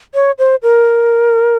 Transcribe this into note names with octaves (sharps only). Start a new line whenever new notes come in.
C#5
C5
A#4